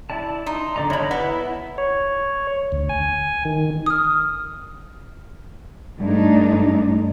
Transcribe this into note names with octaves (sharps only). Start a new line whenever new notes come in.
E4 D5 A5
D#4 C6
D3 D5 A#5
E2 B2 C#5 D#5 B5
B3 E4
C#5
D2
G#5
D#3
D#6 F6
G2 G#3 A3 D4 D#4